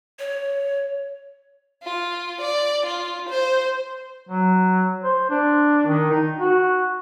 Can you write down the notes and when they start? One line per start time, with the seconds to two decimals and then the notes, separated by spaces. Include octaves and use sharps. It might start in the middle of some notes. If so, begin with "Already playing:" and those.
0.20 C#5
1.84 F4
2.41 D5
2.86 F4
3.30 C5
4.29 F#3
5.04 C5
5.30 D4
5.86 D#3
6.11 D#4
6.39 F#4